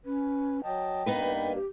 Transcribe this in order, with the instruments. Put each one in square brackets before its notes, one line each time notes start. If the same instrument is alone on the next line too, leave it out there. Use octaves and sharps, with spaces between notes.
[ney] C#4 [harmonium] B4
[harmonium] F#3 D#5 A5 [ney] G5
[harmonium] G2 A#3 [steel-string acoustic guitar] B3 D#4 B4
[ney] G4